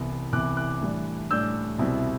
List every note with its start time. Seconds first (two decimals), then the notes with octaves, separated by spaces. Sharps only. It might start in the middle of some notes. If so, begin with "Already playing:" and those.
Already playing: C2 C3 E3 B3
0.33 C2 C3 E3 B3 D6 F#6
0.57 D6 F#6
0.81 A2 E3 G3 D4
1.31 A2 E3 G3 D4 E6 G6
1.78 C2 B2 G3 C4 E4